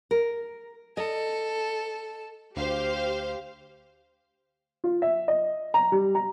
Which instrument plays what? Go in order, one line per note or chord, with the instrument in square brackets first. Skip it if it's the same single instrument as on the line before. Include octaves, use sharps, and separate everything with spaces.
[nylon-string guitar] A#4
[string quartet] A4 [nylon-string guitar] D#5
[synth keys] D2 [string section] G4 C5 F5
[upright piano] F4
E5
D#5
A#5
G3
A#5